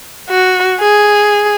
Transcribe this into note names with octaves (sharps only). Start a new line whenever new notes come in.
F#4
G#4